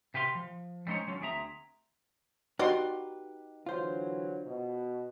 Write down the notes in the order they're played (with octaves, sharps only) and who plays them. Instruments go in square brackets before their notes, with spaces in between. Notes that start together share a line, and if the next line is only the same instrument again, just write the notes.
[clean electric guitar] C3 G4 B4 F5 C6
F3
G3 G#3 C#4 D#4 C5 C#5
F#3 C#4 F4 A4
D2 C4 G#4 E5 A#5
[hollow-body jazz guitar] D#4 G4 B4 [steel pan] F#4 C6 [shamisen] D5 D#5
[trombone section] D3 E3 F#3 [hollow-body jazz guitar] F4 C5
[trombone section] B2